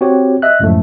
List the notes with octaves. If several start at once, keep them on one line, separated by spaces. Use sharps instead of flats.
C4 F#4 G4 C#5
D#5 E5 F#6
C#2 F#2 A2 F3 A3